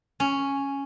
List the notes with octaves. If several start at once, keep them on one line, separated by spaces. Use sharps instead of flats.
C#4